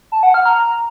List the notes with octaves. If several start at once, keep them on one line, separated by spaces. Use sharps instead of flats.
A5
F#5
F6
A#5